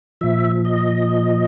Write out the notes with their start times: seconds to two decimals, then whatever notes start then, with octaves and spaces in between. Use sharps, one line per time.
0.21 A#2 F3 E5
0.65 D#5